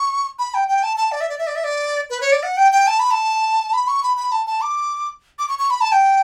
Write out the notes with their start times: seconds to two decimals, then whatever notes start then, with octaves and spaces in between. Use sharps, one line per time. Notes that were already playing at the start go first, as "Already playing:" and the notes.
Already playing: C#6
0.39 B5
0.54 G5
0.68 G5
0.83 A5
0.97 A5
1.12 D5
1.21 E5
1.29 D5
1.38 E5
1.47 D5
1.56 E5
1.64 D5
2.10 B4
2.21 C#5
2.32 D5
2.43 F#5
2.57 G5
2.72 G5
2.87 A5
2.99 B5
3.11 A5
3.73 B5
3.88 C#6
4.03 B5
4.17 B5
4.32 A5
4.47 A5
4.61 D6
5.39 D6
5.49 C#6
5.59 C#6
5.70 B5
5.81 A5
5.92 G5